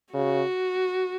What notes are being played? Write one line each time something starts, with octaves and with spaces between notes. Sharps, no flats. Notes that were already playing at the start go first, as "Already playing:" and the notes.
C#3 F#4